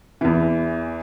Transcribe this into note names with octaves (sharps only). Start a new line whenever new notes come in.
E2 E3